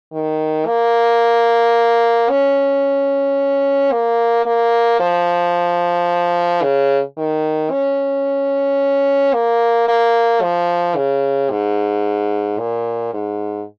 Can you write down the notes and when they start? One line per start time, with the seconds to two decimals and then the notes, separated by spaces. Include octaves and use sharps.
0.13 D#3
0.67 A#3
2.30 C#4
3.92 A#3
4.45 A#3
5.00 F3
6.63 C#3
7.17 D#3
7.71 C#4
9.34 A#3
9.88 A#3
10.42 F3
10.96 C#3
11.51 G#2
12.59 A#2
13.14 G#2